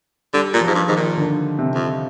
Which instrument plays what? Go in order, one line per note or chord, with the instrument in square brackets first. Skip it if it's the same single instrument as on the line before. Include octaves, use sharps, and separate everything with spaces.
[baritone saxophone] D3 [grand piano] G3
[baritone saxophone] A#2
[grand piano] F3
[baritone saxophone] G#2
G2
[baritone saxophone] G#2 [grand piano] D#3
[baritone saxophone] A#2
[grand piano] D3
C3
[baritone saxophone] F2